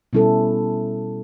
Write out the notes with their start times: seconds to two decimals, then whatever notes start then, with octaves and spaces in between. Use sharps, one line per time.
0.13 B2 G3 C#4 E4 A4